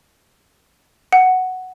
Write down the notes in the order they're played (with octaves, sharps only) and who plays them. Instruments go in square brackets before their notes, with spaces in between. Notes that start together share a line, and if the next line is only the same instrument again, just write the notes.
[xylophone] F#5